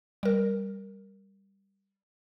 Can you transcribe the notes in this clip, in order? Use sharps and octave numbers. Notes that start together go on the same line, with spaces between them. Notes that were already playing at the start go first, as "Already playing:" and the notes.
G3 A#4